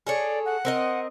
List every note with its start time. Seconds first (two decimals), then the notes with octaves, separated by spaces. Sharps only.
0.07 G#4 A4 C#5 D5
0.45 F#5
0.65 C4 A#4 D#5